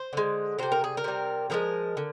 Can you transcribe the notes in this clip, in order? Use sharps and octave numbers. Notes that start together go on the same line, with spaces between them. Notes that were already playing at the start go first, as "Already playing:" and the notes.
Already playing: C5
D3 G#3
C3 G3 C5
A#4
G#4
A#4
C3 G3
D3 F3 G#3 A#4
D3